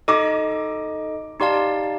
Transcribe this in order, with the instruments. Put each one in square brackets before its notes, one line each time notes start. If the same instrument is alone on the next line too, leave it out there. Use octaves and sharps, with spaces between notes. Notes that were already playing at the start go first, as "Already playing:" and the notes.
[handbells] D#4 A4 D#5 [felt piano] D6
[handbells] D#4 G4 D5 F5 A5 [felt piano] C6